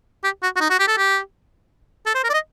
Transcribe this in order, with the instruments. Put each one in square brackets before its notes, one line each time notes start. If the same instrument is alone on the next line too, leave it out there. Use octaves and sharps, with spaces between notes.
[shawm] G4
F#4
F#4
D#4
F#4
G4
A4
G4
A4
C5
A#4
D5
D#5